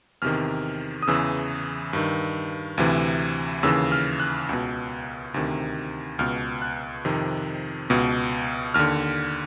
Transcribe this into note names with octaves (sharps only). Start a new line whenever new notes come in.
E2 C3 D#3 F6
D#6
E2 C#3 E3 E6
G2 D#3
D2 C3 E3
D#2 C#3 E3 E6
F6
F#6
C#2 B2
D2 C3 D#3
C#2 B2 F6
F#6
F2 C3 D#3
C#2 B2
D#2 D3 F6